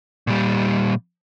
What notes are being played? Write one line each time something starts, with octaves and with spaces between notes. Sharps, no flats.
A#2 G3